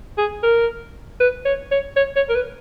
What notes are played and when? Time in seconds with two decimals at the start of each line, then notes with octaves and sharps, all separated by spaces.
0.18 G#4
0.43 A#4
1.20 B4
1.45 C#5
1.71 C#5
1.96 C#5
2.16 C#5
2.29 A#4
2.35 B4